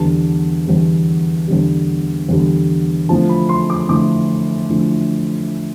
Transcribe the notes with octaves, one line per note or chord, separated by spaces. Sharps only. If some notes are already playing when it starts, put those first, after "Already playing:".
Already playing: E2 D3 G3 A5
E2 D3 G3
E2 D3 G3
E2 D3 G3
D3 F3 A3 E4 A5
B5
C6
D6
D3 F3 A3 E4 D6
D3 F3 A3 E4